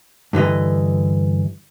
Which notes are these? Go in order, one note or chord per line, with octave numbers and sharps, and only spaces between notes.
G2 D3 E3 D#5